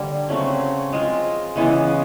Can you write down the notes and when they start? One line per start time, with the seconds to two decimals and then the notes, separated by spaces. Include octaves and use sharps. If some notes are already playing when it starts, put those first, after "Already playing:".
Already playing: D3 G3 A#3
0.29 C#3 F#3 A3 C4
0.92 G#3 C4 F4 A#4
1.56 C#3 E3 G#3 B3